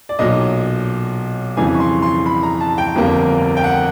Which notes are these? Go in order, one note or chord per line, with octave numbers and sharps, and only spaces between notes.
D5
B1 A#2 F#3 D#5
F2 C#3 E3 G3 G#5
C#6
C6
C6
B5
A#5
A5
G5
G1 F2 D3 G3 A#3
G5
F#5